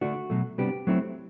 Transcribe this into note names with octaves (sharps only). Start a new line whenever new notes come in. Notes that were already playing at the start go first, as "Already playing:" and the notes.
D3 A3 D4 F#4
B2 F#3 A3
C3 G3 B3 D4 G4
F#3 A3 C4 E4